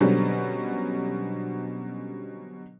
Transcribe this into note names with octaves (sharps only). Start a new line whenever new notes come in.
B2 D3 F#3 G3 C4 C#4